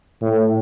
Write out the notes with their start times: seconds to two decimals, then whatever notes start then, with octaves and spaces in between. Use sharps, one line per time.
0.22 A2